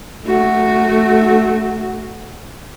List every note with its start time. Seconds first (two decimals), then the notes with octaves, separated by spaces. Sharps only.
0.26 A3 F#4